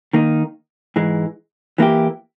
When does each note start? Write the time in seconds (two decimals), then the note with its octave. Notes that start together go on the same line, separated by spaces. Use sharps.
0.13 D#3 A#3 D#4
0.96 G#2 E3 G#3
1.78 E3 A#3 E4 G4